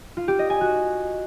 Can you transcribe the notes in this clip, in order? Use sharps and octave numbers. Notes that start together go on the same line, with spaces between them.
F4
G4
D#5
G#5
F#4